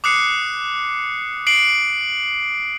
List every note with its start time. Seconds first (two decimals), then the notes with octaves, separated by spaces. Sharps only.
0.04 D6 D#6 F#6 C7 C#7
1.47 C7 D7 F#7